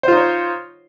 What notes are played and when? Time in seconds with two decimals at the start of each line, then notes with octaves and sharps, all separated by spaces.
0.03 C5
0.08 F4
0.13 D#4
0.17 C#5